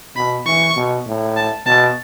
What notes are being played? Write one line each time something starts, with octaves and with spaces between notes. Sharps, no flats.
B2 B5
E3 C#6
B2
A2
A5
B2 A5